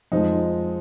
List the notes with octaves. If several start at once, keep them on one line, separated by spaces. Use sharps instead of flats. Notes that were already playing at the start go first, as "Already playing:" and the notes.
F2 F3 G#3 D#4